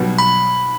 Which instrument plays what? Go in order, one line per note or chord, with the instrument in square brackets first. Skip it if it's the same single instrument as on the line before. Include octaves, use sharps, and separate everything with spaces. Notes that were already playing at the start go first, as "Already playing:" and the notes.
Already playing: [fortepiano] B1 B2 G3 B3 F#4
[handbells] B5